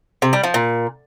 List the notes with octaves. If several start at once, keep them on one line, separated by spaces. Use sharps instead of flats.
C3
G3
F3
A#2